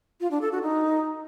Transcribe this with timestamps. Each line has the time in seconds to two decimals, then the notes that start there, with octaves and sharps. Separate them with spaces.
0.21 F4
0.31 D4
0.41 A4
0.52 F#4
0.62 D#4